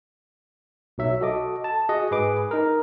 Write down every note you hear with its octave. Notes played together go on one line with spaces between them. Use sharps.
B1 F#3 E5
F#4 A4 D#5 D6
A5
F#4 G#4 D#5 F#5
G#2 G#4 B4 D6
D#4 A#4